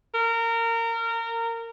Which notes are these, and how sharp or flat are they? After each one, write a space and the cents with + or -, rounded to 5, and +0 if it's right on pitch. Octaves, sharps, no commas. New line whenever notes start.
A#4 -25